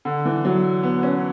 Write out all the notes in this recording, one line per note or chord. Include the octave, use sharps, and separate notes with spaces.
D3
E3
F#3
B3
C#4